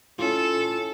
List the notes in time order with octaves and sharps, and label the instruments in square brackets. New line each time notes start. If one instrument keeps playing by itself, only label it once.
[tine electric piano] C#4 E4 F4 [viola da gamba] A4